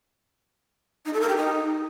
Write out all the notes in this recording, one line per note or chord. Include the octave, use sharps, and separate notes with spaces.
D#4
A4
A#4
G4
D#4